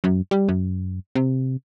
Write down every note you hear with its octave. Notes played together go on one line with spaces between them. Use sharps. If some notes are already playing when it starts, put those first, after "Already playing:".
F#2
G3
F#2
C3